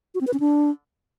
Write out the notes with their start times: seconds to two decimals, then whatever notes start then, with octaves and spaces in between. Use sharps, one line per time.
0.15 F#4
0.21 C4
0.27 B4
0.33 C#4
0.40 D4